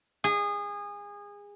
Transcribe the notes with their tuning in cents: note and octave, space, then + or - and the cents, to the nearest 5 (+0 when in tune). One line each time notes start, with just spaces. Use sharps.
G#4 -25